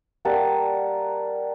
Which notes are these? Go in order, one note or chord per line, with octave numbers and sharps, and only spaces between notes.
G3 A#3 F#5 A5